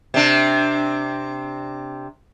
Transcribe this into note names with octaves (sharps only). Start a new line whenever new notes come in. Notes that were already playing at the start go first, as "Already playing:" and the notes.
C3 D4